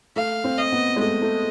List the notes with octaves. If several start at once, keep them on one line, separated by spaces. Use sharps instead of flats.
A3 F5
C4
D#5
B3
G#3
A3 D#5
A3